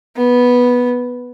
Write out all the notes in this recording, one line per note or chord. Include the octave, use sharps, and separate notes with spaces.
B3